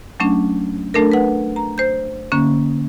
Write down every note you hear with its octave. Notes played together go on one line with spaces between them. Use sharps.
F#3 A3 C#4 D4
A3 D4 A4 A#4
B4 F#5
A#5
C5 G6
D3 A#3 C#4